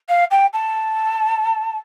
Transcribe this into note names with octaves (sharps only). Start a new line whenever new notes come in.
F5
G5
A5